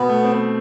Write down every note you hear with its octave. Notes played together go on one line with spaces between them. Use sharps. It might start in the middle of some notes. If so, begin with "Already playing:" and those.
Already playing: B2 B3
A3
C4